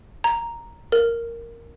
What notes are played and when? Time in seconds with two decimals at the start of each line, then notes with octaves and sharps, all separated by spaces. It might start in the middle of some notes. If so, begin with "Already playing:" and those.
0.24 A#5
0.92 A#4